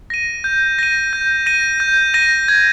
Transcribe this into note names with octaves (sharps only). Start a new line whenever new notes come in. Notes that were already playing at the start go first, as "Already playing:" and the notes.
A#6 D#7
G6
A#6 D#7
G6
A#6 D#7
G6
A#6 D#7
G#6